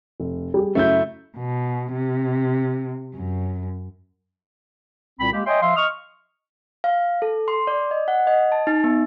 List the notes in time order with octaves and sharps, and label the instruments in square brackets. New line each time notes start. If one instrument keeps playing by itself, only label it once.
[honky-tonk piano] F1
G3 G#4
[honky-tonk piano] F#2 C#3 F#3 [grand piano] A3 E4 G6
[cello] B2
C3
F#2
[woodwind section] C2 A#2 C4 B5
G#3 A#3 G4
C#5 D#5 E5 G5 G#5 C6
F3 E5 F5 C6
D#5 C#6 D#6 F6
[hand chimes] F5
A4
C6
D5
D#5
F#5
D#5
A5
D#4
B3